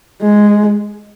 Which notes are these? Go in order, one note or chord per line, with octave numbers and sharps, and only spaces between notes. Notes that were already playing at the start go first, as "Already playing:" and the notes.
G#3